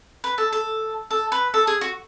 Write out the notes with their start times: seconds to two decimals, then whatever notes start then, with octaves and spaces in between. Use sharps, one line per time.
0.24 B4
0.38 A4
0.52 A4
1.11 A4
1.32 B4
1.54 A4
1.67 G#4
1.81 F#4